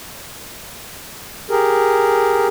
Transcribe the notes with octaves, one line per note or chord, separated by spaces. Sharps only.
G4 G#4 A#4